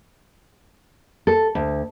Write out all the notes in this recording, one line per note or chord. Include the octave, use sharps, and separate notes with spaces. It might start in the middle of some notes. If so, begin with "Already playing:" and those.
A4
D2